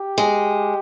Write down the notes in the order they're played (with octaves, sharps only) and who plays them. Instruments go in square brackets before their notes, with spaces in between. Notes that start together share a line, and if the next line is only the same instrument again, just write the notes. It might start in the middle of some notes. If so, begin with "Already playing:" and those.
Already playing: [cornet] G4
[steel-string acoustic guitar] G#3